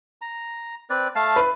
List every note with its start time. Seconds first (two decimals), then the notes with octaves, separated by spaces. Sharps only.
0.22 A#5
0.90 C4 B4 D5
1.15 A3 F5 A5
1.36 B4